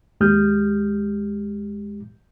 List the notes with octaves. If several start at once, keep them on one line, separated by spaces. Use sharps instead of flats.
D#2 G#3 G4 D#6 F6 G6